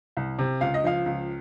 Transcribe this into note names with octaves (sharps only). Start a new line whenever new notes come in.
C2
C3
C#2 F5
D#5
F3 F5
C#2